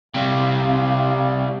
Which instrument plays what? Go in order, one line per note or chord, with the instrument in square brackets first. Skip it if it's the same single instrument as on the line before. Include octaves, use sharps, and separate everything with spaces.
[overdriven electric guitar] C3 G3 [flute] F5